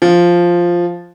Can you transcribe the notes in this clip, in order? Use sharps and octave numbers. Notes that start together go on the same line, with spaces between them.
F3